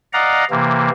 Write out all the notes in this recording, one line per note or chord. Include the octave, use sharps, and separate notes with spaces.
D5 D#5 F5 F#5 A#5
C3 E3 A#3